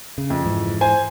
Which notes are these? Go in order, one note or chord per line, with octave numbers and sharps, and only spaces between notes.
C#3
F2
G#2 E3
C5 G#5